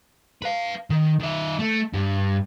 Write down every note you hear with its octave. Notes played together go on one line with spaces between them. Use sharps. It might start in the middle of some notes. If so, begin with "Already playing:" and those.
B4 F5
D#3
D#3 E5
A3
G2